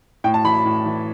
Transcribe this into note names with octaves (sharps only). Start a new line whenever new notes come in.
A2 G5
A5
E3 B5
B5
A2
E3